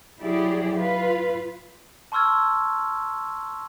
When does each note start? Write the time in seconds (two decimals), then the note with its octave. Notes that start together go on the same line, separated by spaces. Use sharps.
0.21 F#3 E4 G4 G#4 D5
0.75 F4 B4
2.12 A5 C6 C#6 E6 F6 G#6